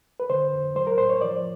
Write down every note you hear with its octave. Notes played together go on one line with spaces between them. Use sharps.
B4
D3 C5
F2
F#3 C5
A#4
A2 C5
C#5
F3 D5